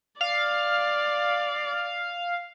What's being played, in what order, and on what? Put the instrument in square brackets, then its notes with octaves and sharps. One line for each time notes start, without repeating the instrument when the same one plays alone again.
[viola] D5 [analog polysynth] F5